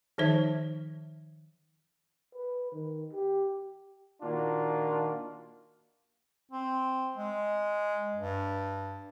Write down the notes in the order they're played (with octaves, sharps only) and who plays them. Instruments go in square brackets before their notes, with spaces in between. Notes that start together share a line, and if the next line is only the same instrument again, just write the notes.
[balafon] D#3 F3 D#4 C5 E5
[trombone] B4
D#3
G4
[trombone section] A#2 D#3 A#3 D4 F4 F#4
[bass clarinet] C4
G#3
G2